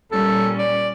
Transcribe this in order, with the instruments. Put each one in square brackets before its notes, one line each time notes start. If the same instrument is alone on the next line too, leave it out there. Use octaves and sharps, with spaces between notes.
[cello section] A#2 G3 C#4 [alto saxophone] A4
[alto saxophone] D5